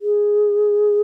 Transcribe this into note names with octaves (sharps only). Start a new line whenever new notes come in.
G#4